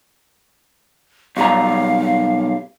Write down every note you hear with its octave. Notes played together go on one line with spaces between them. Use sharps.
B1 G3 F5 A#5